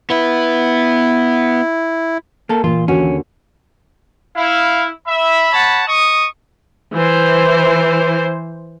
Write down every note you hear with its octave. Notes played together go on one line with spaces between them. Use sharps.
B3 E4 B4
A#3 A4
A#2 E3 A#3 F4
D#2 D3 C#4 F#4
E4 F5
E5 B5
C#5 F#5 A5
D#5 C#6 D#6
E3 C5